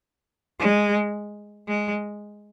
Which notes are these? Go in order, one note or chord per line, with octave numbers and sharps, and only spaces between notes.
G#3
G#3